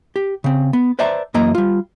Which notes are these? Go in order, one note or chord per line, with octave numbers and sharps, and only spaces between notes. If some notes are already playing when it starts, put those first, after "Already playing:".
G4
C#3 C4
B3
B4 C5 D5 E5 A5 A#5
F#2 E3 A#3 D#5 A#5
G3 F4